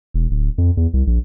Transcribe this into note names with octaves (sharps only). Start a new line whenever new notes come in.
E1
D1
F2
E2
C2
A#1